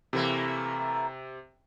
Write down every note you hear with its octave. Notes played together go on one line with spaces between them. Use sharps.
C3 E3 A3 A#3